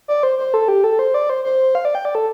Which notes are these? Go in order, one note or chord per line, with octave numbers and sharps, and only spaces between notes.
D5
C5
C5
A4
G4
A4
C5
D5
C5
C5
F5
D5
G5
D5
A4